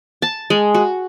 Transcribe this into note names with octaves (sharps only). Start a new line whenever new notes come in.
A5
G#3
F#4